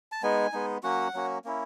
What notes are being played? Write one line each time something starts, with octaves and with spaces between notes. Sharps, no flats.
A5
G#3 B3 D#4 G#5
G#3 B3 D#4
F#3 A#3 C#4 F#4 F#5
F#3 A#3 C#4 F#4
A#3 C#4 E4